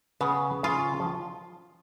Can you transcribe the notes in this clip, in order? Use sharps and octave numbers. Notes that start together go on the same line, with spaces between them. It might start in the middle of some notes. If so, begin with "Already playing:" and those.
C#3 B3
C#3 F4
F3